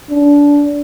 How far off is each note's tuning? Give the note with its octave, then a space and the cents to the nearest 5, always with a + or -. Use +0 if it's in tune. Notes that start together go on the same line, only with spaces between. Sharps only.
D4 -25